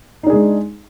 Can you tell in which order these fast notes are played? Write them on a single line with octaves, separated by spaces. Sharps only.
D#4 D4 G#4 G#3